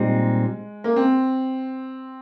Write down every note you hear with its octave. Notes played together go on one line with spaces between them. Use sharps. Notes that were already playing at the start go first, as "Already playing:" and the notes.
Already playing: A#2 G3 G#3 C4 D#4
A#3
C4